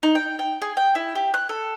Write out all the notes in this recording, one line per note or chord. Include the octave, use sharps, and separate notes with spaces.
D#4
G5
G5
G#4
G5
E4
G4
F#6
A4